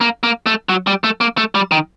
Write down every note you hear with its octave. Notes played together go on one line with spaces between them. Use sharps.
A#3
A#3
A3
F#3
G3
A3
A#3
A3
G3
D#3